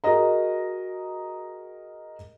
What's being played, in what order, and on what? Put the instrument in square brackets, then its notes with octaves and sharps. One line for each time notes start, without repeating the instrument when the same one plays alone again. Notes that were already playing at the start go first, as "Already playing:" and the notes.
[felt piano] F#4 G#4 A#4 D#5 A#5